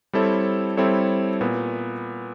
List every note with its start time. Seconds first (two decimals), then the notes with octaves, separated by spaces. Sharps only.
0.13 G3 C4 E4 A4 C#5
0.77 G3 C4 E4 A4 C#5
1.41 A#2 B3